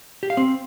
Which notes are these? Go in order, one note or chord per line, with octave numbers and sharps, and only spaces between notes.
G4
F5
C4